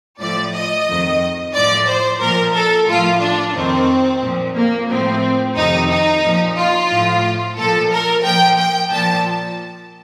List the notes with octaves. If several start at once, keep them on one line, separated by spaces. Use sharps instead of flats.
A2 F3 D5
D#5
F2 D#3
A2 F3 D5
C5
A#2 F3 A#4
A4
A2 F3 F4
D4
F2 D#3 C4
A#2 F3
A#3
A2 F3 C4
F2 C3 D#3 D#4
D#4
A#2 F3
F4
A2 F3
A#2 F3 A4
A#4
A#2 F3 G5
G5
A#2 F3 A5